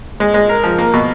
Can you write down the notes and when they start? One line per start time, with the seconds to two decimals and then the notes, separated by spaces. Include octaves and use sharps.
0.20 G#3
0.34 G#3
0.49 A#4
0.64 F3
0.78 A#3
0.94 B2